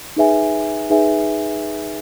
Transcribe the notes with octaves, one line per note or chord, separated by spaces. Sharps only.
D#4 G#4 B4 E5 G#5
D#4 G#4 B4 E5 G#5